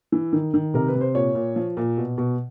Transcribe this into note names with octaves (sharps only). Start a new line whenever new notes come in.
E3
D#3
D#3
C3 A#4
B4
C3
C5
A#2 C#5
A#2
F3
A#2
B2
B2